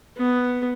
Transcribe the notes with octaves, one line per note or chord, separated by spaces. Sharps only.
B3